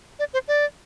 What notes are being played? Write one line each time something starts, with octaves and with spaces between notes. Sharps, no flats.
D5
C5
D5